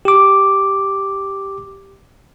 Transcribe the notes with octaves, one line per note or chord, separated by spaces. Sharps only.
G4 D6